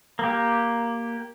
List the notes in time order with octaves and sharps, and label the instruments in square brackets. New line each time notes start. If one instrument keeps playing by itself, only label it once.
[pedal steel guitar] A#3 G4